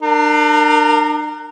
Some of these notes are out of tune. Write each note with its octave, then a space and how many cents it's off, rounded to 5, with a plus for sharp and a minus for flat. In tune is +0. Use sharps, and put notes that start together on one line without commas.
D4 +35 A#4 -15